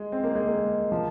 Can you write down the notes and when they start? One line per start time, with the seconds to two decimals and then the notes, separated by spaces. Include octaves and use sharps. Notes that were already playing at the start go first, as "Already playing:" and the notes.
Already playing: G#3
0.12 C4
0.24 A#3
0.35 G#3
0.47 A#3
0.92 F3